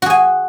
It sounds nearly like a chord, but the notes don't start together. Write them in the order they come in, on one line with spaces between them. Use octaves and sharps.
F#4 G#4 G#5